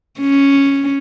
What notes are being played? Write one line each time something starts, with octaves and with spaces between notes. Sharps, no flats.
C#4